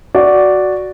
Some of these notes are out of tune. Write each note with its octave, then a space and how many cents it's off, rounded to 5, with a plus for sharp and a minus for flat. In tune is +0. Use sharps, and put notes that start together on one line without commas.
F#4 +0 D5 -5